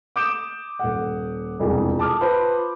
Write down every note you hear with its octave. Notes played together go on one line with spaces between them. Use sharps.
D6 D#6 G6 D7 E7
D#1 F#5
E1 C2 F2 G#4
A5 D6 D#6 F6
F4 B4 C5 A5